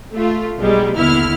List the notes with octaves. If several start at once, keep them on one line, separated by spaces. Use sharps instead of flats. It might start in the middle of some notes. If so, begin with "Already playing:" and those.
A3 F4
B1 B2 G3 G#3 D#4
D#2 D3 B3 E4 F6